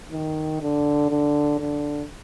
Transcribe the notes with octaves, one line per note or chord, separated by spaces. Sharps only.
D#3
D3
D3
D3